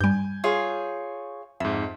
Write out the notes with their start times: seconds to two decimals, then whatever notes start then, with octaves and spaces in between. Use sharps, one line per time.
0.01 G2 G3 G#5 G6
0.44 F4 G#4 C#5 C#6
1.60 F2 G#2 E5